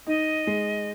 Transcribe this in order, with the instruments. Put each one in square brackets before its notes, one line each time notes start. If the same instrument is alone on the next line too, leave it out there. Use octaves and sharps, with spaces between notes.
[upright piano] D#4 [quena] D#5
[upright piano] G#3